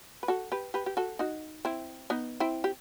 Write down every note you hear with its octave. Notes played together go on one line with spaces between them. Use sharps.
B4
F#4 A4
G4 B4
G4 B4
G4
F#4 A4
D#4 F#4
C4 E4
B3 D#4
C4 E4
G4